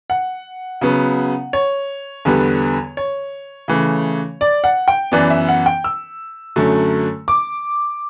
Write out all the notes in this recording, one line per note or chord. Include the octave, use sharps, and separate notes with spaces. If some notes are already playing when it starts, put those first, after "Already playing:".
F#5
C#3 F#3 B3
C#5
E2 D3 G3 B3
C#5
C#3 E3 A3
D5
F#5
G5
F#2 E3 B3 D5
E5
F#5
G5
E6
F#2 D3 F#3 A3
D6